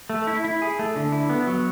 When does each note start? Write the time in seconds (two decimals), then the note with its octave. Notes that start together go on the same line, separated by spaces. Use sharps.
0.10 A3
0.27 E4
0.44 E4
0.62 G#4
0.79 A3
0.96 D3
1.12 E4
1.29 B3
1.47 F#3